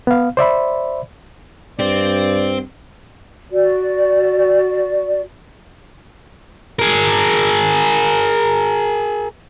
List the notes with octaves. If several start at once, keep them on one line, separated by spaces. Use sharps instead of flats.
B3 F5
C5 D5 E5 B5
G2 C4 D5
F#4 D5
G#4 A#4